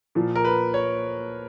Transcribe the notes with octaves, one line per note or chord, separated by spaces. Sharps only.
A#2 F3
A#4
B4
C#5